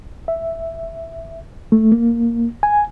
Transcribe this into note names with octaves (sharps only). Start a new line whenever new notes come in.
E5
A3
A#3
G#5